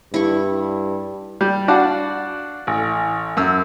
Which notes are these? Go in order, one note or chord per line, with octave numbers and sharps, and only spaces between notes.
G2 E4 C#6
G3
D4 F#4 D5 F5 F#5 A5
A1
F#2 E6